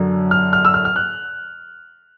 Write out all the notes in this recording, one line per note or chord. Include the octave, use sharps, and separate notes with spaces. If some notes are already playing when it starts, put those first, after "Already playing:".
Already playing: F#2 D3 F#3
F6
F6
E6
F6
F6
F#6